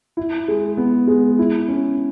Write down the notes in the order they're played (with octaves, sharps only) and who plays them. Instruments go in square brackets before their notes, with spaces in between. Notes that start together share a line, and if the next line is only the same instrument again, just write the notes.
[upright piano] E4
G#3
B3
G#3
E4
C#4